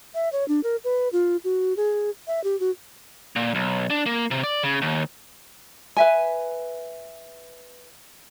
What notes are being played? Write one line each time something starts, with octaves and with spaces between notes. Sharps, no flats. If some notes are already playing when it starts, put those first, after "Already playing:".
E5
C#5
D4
A#4
B4
F4
F#4
G#4
E5
G4
F#4
A#2
B1
D4
A#3
C3
D5
C#3
D#2
B4 E5 G#5